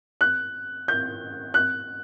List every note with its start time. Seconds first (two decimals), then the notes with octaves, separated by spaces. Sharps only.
0.21 F#6
0.88 G6
1.54 F#6